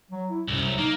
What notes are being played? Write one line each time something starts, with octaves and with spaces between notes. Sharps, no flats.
F#3
E4
C2 F#2
F#3
A#3 D#4